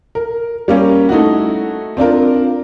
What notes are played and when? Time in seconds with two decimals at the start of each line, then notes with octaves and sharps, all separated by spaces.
0.15 A#4
0.68 G3 A#3 C#4
1.09 A3 D#4 E4 F#4
1.97 C4 D4 F4 A#4